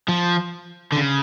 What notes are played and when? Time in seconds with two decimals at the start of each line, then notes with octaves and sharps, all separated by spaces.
0.09 F3
0.93 D3
0.97 C#3